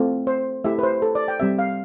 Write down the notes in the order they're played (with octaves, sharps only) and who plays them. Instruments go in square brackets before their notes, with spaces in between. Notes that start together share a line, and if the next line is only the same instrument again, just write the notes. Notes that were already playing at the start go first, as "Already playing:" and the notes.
Already playing: [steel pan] A3 C4 F4
C5
A3 E4 G4 E5
B4
C5
A4
D5
G5
G3 C4 G4 E5
F5